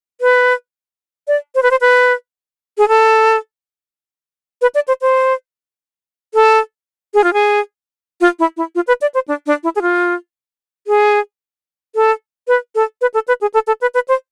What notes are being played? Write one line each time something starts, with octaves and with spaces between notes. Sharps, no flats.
B4
D5
C5
B4
C5
B4
G#4
A4
B4
D5
C5
C5
A4
G#4
F4
G#4
F4
E4
E4
F4
B4
D5
C5
D4
D4
E4
G#4
F4
G#4
A4
B4
A4
B4
A4
B4
G#4
A4
A4
B4
B4
C5